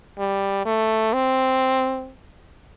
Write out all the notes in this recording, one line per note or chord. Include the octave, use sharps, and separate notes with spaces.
G3
A3
C4